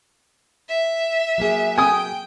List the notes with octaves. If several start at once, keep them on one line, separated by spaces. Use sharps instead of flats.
E5
F#3 A#3 G#4
G5 G#5 D#6